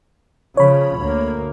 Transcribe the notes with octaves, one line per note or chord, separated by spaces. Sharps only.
C#3 F3 C#5 B5
D2 A#3